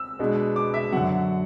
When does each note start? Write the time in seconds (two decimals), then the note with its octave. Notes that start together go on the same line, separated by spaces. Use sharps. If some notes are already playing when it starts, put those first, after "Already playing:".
Already playing: E6
0.19 B2 G#3 B3 D4
0.56 D6
0.74 E5
0.92 F#2 D3 F#3 F#5